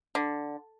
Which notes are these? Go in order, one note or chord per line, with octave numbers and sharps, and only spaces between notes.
D3